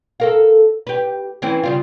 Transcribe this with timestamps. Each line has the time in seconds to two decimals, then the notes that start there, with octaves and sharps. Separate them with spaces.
0.20 A4 A#4 F5
0.87 G4 B4
1.42 E3 C4 C#4
1.63 C#3 G3 F4